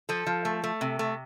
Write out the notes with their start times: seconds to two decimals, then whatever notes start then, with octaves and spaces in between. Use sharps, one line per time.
0.09 F3 A4
0.27 F3
0.45 A3
0.64 A3
0.81 C3
0.99 A3